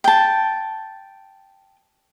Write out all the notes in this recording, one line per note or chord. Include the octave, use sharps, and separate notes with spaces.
G5 A5